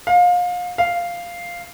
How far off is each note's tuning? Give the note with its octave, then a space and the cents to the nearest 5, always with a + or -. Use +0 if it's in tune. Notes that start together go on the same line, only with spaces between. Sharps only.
F5 +30
F5 -5